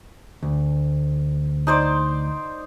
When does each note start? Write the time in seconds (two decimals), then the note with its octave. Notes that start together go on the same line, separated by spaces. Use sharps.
0.43 D2
1.67 D#4 C5 D5